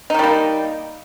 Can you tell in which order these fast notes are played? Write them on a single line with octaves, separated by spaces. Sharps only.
D#4 D#3 G3 A#3